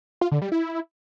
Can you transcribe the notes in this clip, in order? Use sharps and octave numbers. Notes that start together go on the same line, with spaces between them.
F4
D3
G3
E4